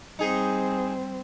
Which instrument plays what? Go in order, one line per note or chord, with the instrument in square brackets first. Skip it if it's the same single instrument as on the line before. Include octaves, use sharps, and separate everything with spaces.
[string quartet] G3 C4 [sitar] D#4 G#4